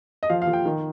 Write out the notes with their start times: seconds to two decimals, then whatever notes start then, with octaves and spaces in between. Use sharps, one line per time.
0.23 D#5
0.30 F3 F5
0.42 F5
0.47 F3
0.53 G5
0.65 D#3